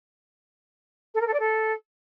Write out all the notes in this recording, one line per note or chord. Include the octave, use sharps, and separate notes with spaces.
A4
A#4
A4
D5
A4